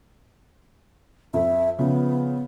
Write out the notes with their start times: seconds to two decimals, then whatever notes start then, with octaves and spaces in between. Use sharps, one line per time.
1.34 F2 E5
1.79 C#3 F3 B3